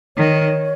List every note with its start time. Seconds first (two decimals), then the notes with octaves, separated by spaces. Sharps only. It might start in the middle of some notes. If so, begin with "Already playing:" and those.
0.17 D#3 C#5